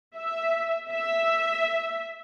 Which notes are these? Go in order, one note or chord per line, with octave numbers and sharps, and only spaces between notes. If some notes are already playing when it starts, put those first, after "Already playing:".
E5
E5